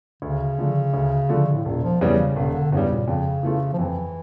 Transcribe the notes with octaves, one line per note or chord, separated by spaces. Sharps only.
D2 C#3
D3 F3 A3
D2
D3 F3 A3
A2
E1 A#2
F3
E2 C#3 E3 G3
C#3
E1 C#3
D3
E2 G2 C#3 G3
A#2
F2 C#3
E3 A3 C#4 F4
F3
F2 E3